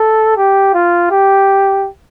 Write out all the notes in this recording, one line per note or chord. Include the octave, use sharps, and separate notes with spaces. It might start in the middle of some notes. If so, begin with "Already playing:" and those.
Already playing: A4
G4
F4
G4